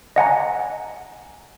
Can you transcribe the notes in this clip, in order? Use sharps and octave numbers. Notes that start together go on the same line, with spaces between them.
D#5 F#5 G#5 A#5